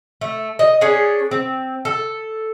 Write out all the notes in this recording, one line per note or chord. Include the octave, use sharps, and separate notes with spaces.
A3
D#5
C#4 D4 G#4 C#5
C4
A4